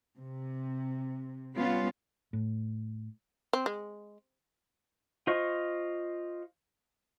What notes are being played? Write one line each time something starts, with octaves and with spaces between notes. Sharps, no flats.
C3
G3 B3 C#4 F4
A2
C4
G#3
F4 C5 D#5 C#6